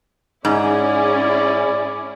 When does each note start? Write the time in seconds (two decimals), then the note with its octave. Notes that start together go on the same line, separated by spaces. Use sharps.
0.45 G#2 C#4 E4 G#4 D5